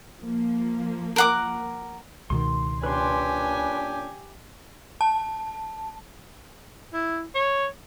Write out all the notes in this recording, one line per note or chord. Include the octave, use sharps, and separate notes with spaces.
F3 A#3
A#4 F#5 D6
C#2 B2 D#3 C6
A#2 C#4 D4 G4 B4 G#5 C6
A5
E4
C#5